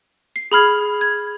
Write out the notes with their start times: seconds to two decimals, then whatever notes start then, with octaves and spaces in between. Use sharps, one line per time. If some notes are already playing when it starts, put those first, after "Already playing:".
0.36 C7
0.52 G#4 B5 F6 G#6
1.01 G#6